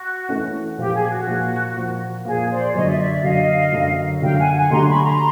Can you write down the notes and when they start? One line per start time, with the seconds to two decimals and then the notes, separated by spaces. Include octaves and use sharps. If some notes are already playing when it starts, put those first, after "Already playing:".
Already playing: F#4
0.29 E3 A3 C#4
0.78 A#2 F3 A#3 G4
0.95 G#4
1.10 F#4
1.27 A#2 F3 A#3
1.76 A#2 F3 A#3
2.25 A#2 F3 A#3 G#4
2.50 C5 D5
2.74 F#2 D3 F#3 C#5 D#5
2.87 D5 E5
2.99 D5 E5
3.11 D5 E5
3.23 F#2 D3 F#3 D#5 F5
3.72 F#2 D3 F#3
4.21 F#2 D3 F#3 F5 G5
4.38 F#5 G#5
4.55 F#5 G#5
4.70 D3 F#3 A3 D4 G4 A#5 C6
4.87 B5 C#6
5.03 A#5 C6